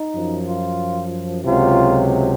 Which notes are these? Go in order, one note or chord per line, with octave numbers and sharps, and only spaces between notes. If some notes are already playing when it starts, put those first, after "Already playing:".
Already playing: D#4
F#2 F3
F4
C#2 C3 F#3 F4